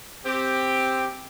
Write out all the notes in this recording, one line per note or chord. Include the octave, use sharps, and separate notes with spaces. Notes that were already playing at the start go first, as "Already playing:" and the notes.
C4 G4